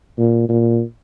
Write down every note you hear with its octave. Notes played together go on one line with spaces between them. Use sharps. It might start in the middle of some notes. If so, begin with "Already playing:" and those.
A#2
A#2